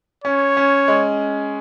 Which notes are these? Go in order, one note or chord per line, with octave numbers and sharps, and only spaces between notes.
C#4 C#5
C#4
G#3